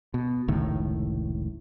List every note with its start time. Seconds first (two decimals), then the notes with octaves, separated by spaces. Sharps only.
0.14 B2
0.48 F1 C#2 A2 D#3